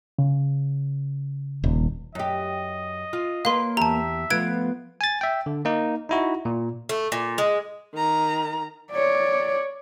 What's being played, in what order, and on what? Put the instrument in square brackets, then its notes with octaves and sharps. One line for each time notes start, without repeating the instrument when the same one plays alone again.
[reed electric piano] C#3
[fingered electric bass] D#1
[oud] F#2 G4 [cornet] D#5
[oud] F4
[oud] A#3 B4 C#5 [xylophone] F5 C6
[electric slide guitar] E2 G4 [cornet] E5 [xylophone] A5 A#5
[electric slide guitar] F3 A3 F4 [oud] B3 [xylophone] G#6 D7
[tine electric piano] G#5 A6
E5 G5
D3
A#3 D#4
D#4 E4 F#4
A#2
[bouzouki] A3
A#2
G#3
[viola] D#3 A#5
[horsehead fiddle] C#5 D5